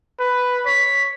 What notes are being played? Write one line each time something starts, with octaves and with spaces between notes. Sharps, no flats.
B4
C#5 B6